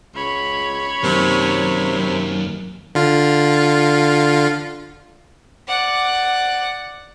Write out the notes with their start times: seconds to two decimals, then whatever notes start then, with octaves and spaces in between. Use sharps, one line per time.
0.15 C#2 C#5 B5
1.03 F#2 C3 D#3 A#3
2.95 D3 F4
5.68 D5 F#5